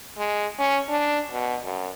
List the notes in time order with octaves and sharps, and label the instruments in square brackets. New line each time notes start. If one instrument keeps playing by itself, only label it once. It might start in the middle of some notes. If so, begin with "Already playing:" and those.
[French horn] G#3
C#4
D4
B2
F#2